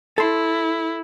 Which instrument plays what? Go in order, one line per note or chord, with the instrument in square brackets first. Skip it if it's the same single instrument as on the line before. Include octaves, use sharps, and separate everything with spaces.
[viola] E4 [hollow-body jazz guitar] A4 C6